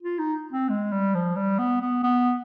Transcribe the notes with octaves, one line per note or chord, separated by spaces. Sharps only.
F4
D#4
C4
G#3
G3
F3
G3
B3
B3
B3